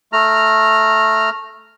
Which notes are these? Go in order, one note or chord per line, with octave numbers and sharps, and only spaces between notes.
A3 A#5 F6